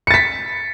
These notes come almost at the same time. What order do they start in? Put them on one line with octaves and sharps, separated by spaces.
C#7 A6 B6